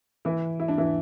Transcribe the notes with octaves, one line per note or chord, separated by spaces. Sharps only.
E3 E4
E4
D4
E3 E4